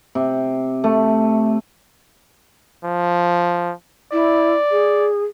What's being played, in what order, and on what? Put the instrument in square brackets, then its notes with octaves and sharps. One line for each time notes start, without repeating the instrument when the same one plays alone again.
[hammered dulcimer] C3
A3
[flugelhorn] F3
[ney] E4 [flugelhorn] D5
[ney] G#4